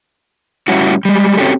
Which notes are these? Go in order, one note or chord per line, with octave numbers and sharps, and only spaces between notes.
A2 G3 C#4 E4 F#4
G3 G#3
C4 C#4 F#4 G4 A4